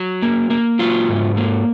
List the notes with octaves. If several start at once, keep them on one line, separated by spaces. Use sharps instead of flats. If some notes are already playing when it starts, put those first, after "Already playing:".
Already playing: F#3
A#3
A#3
F#3 F4
G#2
A#3